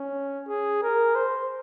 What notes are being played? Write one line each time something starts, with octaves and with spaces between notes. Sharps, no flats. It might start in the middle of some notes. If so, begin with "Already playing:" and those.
Already playing: C#4
G#4
A#4
C5